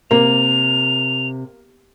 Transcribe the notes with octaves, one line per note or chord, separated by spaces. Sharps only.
C3 A#3 F7